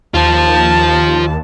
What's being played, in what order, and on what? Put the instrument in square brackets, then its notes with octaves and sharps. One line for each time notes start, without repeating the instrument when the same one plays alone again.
[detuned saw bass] D#2 [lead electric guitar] F4 C5 [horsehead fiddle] A5